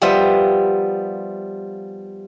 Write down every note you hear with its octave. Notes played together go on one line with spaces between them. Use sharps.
F3 G3 B3 F4 E5